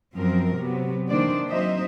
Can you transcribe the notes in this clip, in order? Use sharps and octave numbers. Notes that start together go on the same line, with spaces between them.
F#2 F3 C4 A#4
C3 F#3 B3
D#3 E3 A#3 D4 C5 D5
F#3 C4 D#4 C5 D#5 E5